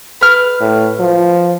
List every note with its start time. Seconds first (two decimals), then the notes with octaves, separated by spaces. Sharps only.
0.21 B4 F6
0.61 A2
1.00 F3